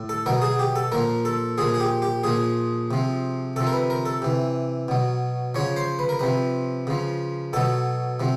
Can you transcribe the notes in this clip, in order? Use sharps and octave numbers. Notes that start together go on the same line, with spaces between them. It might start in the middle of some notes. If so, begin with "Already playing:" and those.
Already playing: A2
A4
B2 F#3 A#4
G#4
G4
A4
A#2 F3 A#4
A4
A#2 F3 G#4
G#4
G4
G4
A#2 F3 G#4
C3 F3
C3 F3 A4
A#4
B4
A#4
A4
C3 E3
B2 F#3
C#3 F3 C#5
C5
B4
A#4
C3 F3 B4
C#3 F3
B2 F#3 A4
C3 F3